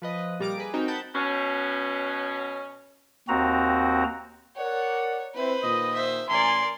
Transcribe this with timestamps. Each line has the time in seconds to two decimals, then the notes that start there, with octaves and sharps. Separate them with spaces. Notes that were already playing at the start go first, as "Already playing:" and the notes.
0.02 F3 B4 D#5
0.40 A#2 G3 A#3 A#5 D6 D7
0.58 G#4 B4
0.73 C4 D#4 F#4 A#4 G5
0.88 F#5 A5 B5 G6
1.14 B2 C#4
3.28 D#2 C4 F#4 A#5
4.56 A#4 C#5 D5 F#5
5.35 C4 E4 B4 C5
5.63 A#2 D#3 D#5
5.94 C5 E5
6.29 A1 A#4 D5 G#5 C6